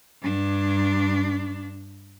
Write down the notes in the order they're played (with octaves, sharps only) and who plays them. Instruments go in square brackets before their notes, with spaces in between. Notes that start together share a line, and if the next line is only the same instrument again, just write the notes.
[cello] G2 D4